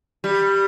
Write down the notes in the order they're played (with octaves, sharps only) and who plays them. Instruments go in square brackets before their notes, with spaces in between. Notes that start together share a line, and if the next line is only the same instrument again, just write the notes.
[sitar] G3